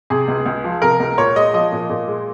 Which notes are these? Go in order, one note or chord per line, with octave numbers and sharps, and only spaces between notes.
C3 G#4
C#2
C#2
F3
C3 A#4
C#2
A#2 C#5
G#3 D#5
F3 D#5
A#2
A#2
G#3